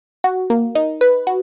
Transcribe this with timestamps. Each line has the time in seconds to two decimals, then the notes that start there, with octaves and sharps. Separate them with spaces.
0.24 F#4
0.50 A#3
0.75 D#4
1.01 B4
1.27 F#4